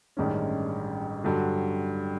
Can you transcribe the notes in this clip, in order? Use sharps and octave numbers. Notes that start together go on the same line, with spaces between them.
A1 G2 D#3 G#3 C#4
G2 D3 F#3